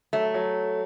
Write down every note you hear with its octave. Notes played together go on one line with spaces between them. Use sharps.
F#3 A3
F#3